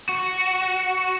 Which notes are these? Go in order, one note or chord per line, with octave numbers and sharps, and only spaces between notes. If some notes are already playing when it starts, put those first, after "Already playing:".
F#4